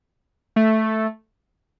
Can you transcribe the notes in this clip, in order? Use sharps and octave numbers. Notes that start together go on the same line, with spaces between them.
A3